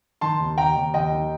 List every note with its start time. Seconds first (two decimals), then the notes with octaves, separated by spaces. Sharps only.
0.21 D#3 A5 C6
0.40 D#2
0.58 D#2 G5 A#5
0.76 D#2
0.94 D#2 D#5 G5
1.12 D#3